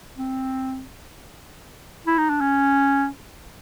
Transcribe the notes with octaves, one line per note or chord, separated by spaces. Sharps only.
C4
E4
D#4
D4
C#4